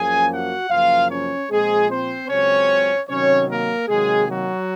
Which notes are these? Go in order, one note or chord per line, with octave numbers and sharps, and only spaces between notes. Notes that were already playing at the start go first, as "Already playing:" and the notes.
Already playing: F#2 F3 A#3 C#4 G#4 G#5
F#4 F#5
F#2 C#3 F3 A#3 F4 F5
C#4 C#5
A#2 F3 G#3 C4 G#4
C4 C5
C#2 C#3 F#3 C4 C#4 C#5
C3 D#3 F#3 C#4 C#5
A#3 A#4
C3 D#3 F#3 G#3 A#3 G#4
F#3 F#4